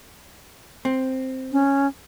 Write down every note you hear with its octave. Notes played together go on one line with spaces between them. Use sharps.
C4
C#4